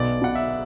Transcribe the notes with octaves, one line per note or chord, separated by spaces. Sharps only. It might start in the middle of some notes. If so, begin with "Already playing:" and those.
Already playing: B1 D5
B2 F#5
E5